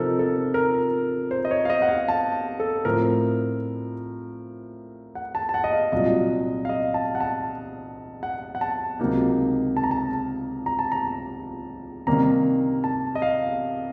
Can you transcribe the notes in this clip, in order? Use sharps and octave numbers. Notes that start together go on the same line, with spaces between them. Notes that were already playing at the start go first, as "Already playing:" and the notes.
Already playing: C3 F3 C4 D#4 A4 A#4
A4
A#4
C5
D#5
C#5
F5
D#5
F#5
F5
A5
A4
A2 F3 C4 A#4
F#5
A5
A5
F#5
D#5
F5
C2 A#2 F#3 D#5
F5
D#5
A5
F#5
A5
F#5
F#5
A5
C#2 C3 F#3 A#3 D#4
A5
A#5
A5
A#5
A5
A#5
C2 C3 D#3 A#3 C#4 A#5
A5
D#5
F5